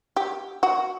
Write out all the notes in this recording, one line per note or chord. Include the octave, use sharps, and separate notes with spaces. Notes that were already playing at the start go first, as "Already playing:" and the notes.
G4
F#4